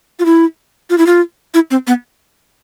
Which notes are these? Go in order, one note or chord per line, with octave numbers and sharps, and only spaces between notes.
F4
E4
F4
E4
F4
E4
C4
B3